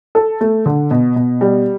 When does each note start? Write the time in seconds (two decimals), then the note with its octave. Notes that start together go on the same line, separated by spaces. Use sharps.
0.15 A4
0.41 A3
0.66 D3
0.91 B2
1.16 B2
1.41 G3